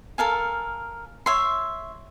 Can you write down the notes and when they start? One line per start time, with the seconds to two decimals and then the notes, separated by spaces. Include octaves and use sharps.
0.18 A4 A#4 F5 G#5
1.26 C#5 E5 C6